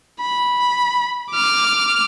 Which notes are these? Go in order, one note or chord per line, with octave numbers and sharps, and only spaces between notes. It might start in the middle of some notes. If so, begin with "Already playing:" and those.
B5
D6 F6